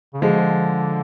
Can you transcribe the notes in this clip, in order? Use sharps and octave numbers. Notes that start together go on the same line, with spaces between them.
C#3
D3 F3 G#3